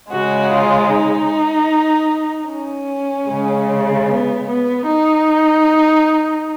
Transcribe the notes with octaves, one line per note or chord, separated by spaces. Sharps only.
C#3 G#3 F#4
F4
D#4
C#4
C#3 G#3
B3
B3
D#4